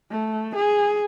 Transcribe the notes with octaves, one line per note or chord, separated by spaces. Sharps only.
A3
G#4